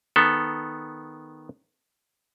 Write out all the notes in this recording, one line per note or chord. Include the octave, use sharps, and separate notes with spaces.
D#3 B3 A4